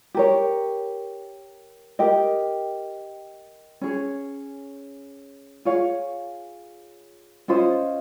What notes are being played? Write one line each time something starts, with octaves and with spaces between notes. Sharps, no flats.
G4 A#4 C#5
G4 A#4 D#5 G5
C#4 G#4 C#5
F4 G#4 C#5 F5
C#4 F4 C5 D#5